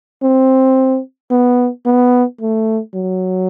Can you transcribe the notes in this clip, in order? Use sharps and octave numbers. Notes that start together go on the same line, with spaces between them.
C4
B3
B3
A3
F#3